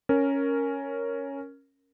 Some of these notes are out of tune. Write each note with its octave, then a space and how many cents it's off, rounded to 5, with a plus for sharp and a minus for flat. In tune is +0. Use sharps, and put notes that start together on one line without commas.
C#4 +0 A#4 +0